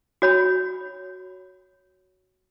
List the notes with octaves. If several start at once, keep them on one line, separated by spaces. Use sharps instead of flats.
F#4 C#5 B5